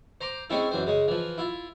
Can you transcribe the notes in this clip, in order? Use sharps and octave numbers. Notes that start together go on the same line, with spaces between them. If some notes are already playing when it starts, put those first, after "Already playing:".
C5 A#5 C6 D6
G#3 C4 C#4 E4 A4
F#2 E3 C5
C#3 G#3
E3 F3
E4 F4